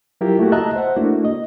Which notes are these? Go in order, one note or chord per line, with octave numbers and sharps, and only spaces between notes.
F#3 E4 F4 G4 A#4
A3 A#3 E4 F#4 G4
D#5 E5 A5 A#5 F#6
C5 E5 F#5
A3 A#3 D4 E4 F#4
D#5